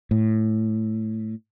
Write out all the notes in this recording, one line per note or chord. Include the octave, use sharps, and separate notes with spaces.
A2